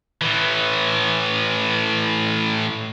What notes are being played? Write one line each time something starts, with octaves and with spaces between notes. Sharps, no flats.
A2 E3